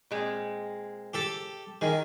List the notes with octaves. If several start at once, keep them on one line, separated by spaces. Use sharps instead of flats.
A#2 G#3 C4
G4 A4
D#3 G#4 A#4